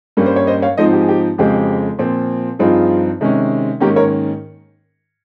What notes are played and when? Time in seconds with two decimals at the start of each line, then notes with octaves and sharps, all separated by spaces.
0.17 G2 G3 A#3 C#4
0.26 C5
0.36 C#5
0.47 C5 D#5
0.62 C#5 F5
0.77 G#2 F3 C4 D#4 C5 D#5
0.93 G4
1.01 G#4
1.08 G4
1.38 F2 C#3 G#3 C4 G4
1.99 A#2 F3 C4
2.59 G2 F3 C4 D#4 F4 G#4
3.21 C3 D#3 G#3 C#4
3.80 G#2 D#3 A#3 C#4 G4 A#4
3.96 A#4 C#5